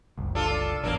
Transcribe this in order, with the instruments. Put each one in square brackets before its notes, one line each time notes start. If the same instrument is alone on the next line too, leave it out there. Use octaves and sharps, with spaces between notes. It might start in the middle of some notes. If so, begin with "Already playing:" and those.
[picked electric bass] F#1 C2
[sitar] D4 F4 A4
[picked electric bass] G#1 E2 [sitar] F#3 A#3 D4